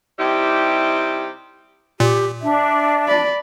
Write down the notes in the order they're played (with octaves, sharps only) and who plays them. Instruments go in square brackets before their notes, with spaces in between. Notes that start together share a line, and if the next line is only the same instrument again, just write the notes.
[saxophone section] C3 G3 D#4 E4 G4
[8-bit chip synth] A#2 [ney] G4
[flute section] D4 [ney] E5
[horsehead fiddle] D5 B5